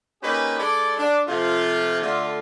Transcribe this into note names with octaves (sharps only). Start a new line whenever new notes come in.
A#3 C#4 D#4 G4 G#4 B4
G#3 D4 A4 D5
D4
C3 F3 A3 F4
D3 A3 F4